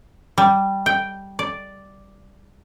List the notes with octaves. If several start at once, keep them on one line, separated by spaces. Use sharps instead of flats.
G3
G5
D5